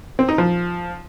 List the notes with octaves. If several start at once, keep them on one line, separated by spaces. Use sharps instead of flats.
C4
D#4
F3